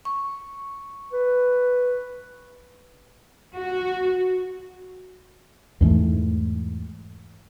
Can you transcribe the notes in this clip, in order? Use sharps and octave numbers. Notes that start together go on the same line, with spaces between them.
C#6
B4
F#4
E2 G#2 E3 A3